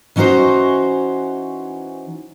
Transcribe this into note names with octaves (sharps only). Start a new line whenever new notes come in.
E3 C#4 D#4 F#4 C5